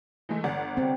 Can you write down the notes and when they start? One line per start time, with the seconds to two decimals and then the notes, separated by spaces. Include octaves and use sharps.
0.29 E3 G#3 A3
0.44 G1 D5 F#5
0.77 C4